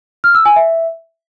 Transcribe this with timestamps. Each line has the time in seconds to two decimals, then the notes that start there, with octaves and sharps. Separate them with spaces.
0.24 F6
0.35 E6
0.45 G#5
0.56 E5